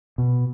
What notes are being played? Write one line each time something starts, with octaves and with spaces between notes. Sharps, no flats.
B2